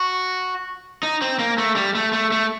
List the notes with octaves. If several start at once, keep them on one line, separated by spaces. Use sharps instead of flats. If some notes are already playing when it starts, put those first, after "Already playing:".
Already playing: F#4
D#4
C4
A#3
A3
G3
A3
A3
A3